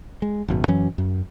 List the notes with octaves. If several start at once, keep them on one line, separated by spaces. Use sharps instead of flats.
G#3
G#1 F#2 B2
F#2 E3 F#3 C#4
F#2